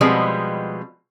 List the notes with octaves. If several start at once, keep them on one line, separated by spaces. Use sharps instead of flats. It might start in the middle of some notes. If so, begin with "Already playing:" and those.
B2 F3 G3 G#3 B3 C4